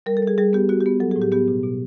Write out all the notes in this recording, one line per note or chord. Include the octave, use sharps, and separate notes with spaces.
G3 A#4
A4
G3 G#4
G3 G#4
B3 G4
B3 F#4
G4
B3
F#3 A4
G#4
A2
G4
B3 G4
B2
B2